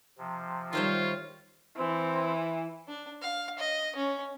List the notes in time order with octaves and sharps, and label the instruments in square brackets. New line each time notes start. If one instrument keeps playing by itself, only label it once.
[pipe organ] C3 F3
[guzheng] D#3 C5 E5 [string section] G3 C#5 [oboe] F4
[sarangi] E3 [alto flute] C4
[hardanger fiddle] D4
F5
D#5
C#4